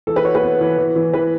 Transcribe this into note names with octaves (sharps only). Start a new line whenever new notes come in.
E3 A4
B4
F#4 C#5
B4
B3
E3
E3
E3
E3 B4